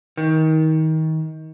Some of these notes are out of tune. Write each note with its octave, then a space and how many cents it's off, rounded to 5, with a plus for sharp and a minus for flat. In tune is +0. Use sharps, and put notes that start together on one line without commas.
D#3 +25